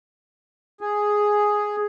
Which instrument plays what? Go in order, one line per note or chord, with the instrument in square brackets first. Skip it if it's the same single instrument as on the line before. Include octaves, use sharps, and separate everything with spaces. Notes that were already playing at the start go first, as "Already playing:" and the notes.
[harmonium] G#4